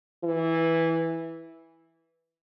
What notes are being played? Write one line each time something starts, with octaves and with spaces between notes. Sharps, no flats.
E3